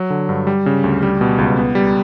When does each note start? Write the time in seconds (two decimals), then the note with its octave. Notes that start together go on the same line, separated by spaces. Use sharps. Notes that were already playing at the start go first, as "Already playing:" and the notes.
Already playing: F#3
0.10 D3
0.29 G2
0.47 G3
0.66 C#3
0.84 D2
1.03 G3
1.21 B2
1.38 C#2
1.57 B3
1.75 G3